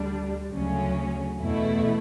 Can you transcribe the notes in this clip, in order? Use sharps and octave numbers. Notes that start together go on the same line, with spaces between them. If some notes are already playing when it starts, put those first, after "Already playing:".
Already playing: D2 D3 G3 D4
D2 C#3 F#3 C#4
E2 B2 A3 E4